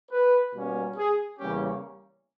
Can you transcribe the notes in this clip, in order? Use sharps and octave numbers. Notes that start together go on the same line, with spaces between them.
B4
B2 G3 A#3 C#4
G#4
E2 C#3 G3 A#3 C#4 G4